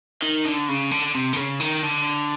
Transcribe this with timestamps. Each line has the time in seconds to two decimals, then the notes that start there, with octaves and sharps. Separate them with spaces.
0.22 D#3
0.45 D3
0.69 C#3
0.91 D3
1.15 C3
1.33 D3
1.37 C#3
1.60 D#3
1.83 D3